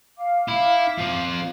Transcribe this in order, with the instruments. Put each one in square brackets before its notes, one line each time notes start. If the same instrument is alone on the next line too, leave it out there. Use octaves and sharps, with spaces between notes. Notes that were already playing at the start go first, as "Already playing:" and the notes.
[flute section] F5 D6
[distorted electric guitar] E4
F3 C4